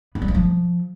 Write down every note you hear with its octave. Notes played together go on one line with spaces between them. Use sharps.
B3
G3
G2
F3